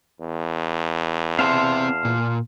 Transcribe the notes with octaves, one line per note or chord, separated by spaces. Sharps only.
E2
C4 C5 E5 F5 A5 C6
A#2